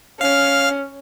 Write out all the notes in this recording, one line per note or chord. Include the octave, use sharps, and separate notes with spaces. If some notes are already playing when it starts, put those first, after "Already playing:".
C#4 F5 F6